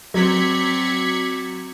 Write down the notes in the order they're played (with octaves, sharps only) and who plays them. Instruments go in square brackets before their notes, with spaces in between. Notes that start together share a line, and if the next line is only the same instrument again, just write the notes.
[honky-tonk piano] F#3 [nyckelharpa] C4 D5 [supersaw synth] G#6 B6 C#7